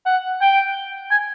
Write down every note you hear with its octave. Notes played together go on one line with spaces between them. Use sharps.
F#5
G5
G#5